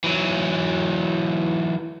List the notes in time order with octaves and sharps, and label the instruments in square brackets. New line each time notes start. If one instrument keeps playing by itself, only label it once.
[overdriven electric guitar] E3 F#3